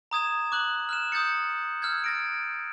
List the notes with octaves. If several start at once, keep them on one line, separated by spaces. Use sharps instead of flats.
A#5 D#6 G#6 E7
D6 F#6 F#7
F6 F#6 E7
D#6 G6 A6 C#7
E6 F6 G6 G#6
A6 A#6 D7